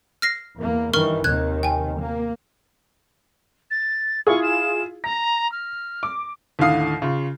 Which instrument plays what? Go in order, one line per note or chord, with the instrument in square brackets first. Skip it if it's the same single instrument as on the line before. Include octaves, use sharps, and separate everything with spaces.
[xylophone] F6 A#6 C7
[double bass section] E2 A#3
[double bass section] G2 D#3 E3 [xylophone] A#4 C#6 F6
[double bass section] D#2 C3 D#3 [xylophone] F#6 G#6
[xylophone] G5 G#5
[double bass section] A#3
[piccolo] A6
[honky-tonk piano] E4 F4 G#4 [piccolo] C#6
[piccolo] E7
[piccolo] A#5 [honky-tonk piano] A#6
[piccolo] F6
[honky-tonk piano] D6
[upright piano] D#2 A2 D3 F5 D#6 C7
C#3 F4